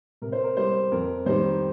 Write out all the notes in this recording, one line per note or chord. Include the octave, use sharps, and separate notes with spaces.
C3 A#4
C5
A#4
G3 C5
F2 A#4
D#3 G3 C5